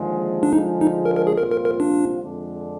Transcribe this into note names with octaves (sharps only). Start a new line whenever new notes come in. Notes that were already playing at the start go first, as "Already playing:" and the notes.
Already playing: D#2 D3 F3 G#3
D4
D3 F3 G#3 D#4
D#4
A#4
A#4
G#4
C2 A#2 F3 C4 F4 A#4
A#4
A#4
D4
F2 D3 G#3 D4